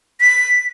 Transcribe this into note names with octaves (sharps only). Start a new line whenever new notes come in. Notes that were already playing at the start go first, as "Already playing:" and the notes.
B6